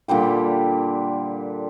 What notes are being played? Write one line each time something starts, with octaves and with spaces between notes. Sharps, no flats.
A#2 D3 G3 G5